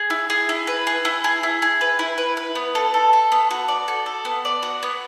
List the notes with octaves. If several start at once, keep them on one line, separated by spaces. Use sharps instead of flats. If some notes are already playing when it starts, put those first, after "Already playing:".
Already playing: G#4
E4
G#4
E4
B4
G#4
E4
G#4
E4
G#4
B4
E4
B4
B4
B3
A4
A4
A4
B3
F#4
D5
A4
A4
B3
D5
F#4
B3